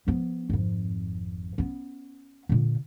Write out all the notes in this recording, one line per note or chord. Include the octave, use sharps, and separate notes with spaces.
F3 B3
G#1 F2
B3 C#4
A#2 D3